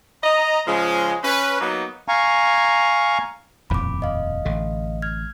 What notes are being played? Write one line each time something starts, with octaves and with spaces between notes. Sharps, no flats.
D#5 A#5
C#3 F3 G#3
C#4 B4
F#3 A#3 B3 D#4
F5 G#5 A#5 C#6
D#1 F2 A2 B5 D6
D#5 F5
A1 D3
F6 G#6